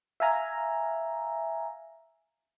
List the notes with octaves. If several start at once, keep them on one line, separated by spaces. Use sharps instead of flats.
E5 F5 G#5 A#5